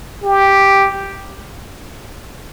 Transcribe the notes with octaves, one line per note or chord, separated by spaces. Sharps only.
G4